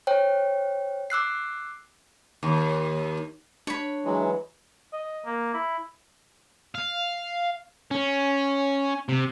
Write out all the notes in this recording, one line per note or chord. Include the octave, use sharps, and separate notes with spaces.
C5 C#5 G5
D6 E6 F#6 C7
D#2
D4 C#5 B5
E3 F#3 G#3
D#5
A#3
E4
F5
C#4
C3